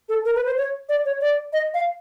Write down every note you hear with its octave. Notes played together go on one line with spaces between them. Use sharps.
A4
A#4
B4
C5
C#5
D5
C#5
D5
D#5
F5